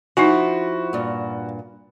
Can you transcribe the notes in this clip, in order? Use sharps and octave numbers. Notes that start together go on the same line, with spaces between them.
F3 D#4 E4 F#4 G#5
G2 A#2